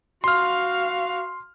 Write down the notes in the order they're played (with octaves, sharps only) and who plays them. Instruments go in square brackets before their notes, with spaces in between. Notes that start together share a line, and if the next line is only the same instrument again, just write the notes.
[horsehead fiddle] F#4 F5 [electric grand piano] C6 F6